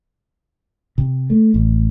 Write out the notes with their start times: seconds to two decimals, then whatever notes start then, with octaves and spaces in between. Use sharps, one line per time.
0.98 C3
1.30 A3
1.54 A1